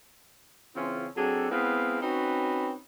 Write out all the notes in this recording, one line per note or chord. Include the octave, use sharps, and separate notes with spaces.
C#3 E3 C4 C#4 F4
F#3 C4 D4 G#4 A4
G#3 B3 C4 E4 D#5 F5
C4 C#4 D#4 F#4 B4